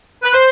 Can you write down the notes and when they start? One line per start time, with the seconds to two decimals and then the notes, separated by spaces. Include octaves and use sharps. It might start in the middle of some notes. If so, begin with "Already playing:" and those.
0.23 B4
0.33 C5